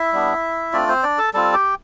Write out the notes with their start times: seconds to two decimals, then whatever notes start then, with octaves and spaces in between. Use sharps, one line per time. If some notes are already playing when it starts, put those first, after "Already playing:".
Already playing: E4 E5
0.12 G3 B3 D4
0.73 A3 C4 D4 F4 D5
0.89 C4 C5
1.03 D4 D5
1.18 A4 A5
1.34 G3 C4 F4 A4 A5
1.53 G4 G5